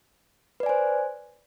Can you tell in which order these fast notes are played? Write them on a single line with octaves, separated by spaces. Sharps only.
B4 D5 G#5 C5